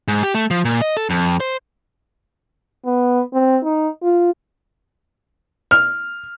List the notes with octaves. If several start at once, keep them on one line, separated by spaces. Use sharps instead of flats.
G#2
G4
A3
F3
A#2
D#5
A4
F2
C5
B3
C4
D#4
F4
F6